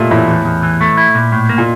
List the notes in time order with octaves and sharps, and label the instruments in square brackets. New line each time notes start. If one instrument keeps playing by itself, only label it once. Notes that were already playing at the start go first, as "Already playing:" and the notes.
Already playing: [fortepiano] A#2 G3 A3
[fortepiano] A2 [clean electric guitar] E3
[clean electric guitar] E2
E2
E3
A3
E4
A#2
A2
A#3
[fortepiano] A#2